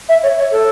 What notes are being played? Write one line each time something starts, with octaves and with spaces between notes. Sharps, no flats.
E5
C#5
C#5
A4